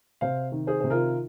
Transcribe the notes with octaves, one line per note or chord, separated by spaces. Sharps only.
C3 C5 F5
D#3
G#4 C5
C3 C5
F4 A#4